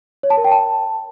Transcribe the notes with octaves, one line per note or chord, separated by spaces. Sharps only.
C#5
A5
A#4
G5
A5